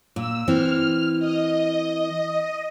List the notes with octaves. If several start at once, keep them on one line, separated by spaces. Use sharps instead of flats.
A#2 E6
E3 C4 F6
D#5